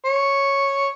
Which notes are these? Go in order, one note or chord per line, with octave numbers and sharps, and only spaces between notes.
C#5